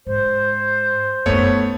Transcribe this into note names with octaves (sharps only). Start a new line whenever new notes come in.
G#2 C5
F#2 A3 B3 D#4 C#5